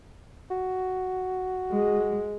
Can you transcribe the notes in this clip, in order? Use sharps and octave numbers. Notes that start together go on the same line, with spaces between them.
F#4
G#3